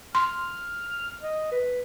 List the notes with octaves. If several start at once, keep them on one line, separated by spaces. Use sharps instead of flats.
C6 F6
D#5
B4